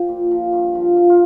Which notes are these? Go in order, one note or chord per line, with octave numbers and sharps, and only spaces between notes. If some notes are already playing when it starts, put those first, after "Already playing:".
Already playing: F3 G4
A#2
F3
G2
F3
F3
F4